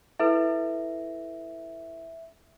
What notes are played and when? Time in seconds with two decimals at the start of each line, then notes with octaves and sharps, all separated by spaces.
0.20 E4 A4 B4 E5